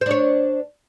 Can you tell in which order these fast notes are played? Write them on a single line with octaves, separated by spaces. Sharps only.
C5 D4 C#5